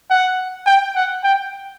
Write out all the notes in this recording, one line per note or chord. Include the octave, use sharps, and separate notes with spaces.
F#5
G5
F#5
G5